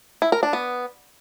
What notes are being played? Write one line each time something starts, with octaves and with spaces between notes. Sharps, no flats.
E4
A#4
D4
B3